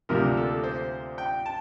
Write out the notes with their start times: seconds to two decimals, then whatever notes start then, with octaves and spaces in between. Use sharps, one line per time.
0.09 D2 C3 F3 A#3 D4 A#4
0.37 A4
0.64 C5
1.18 G5
1.46 A5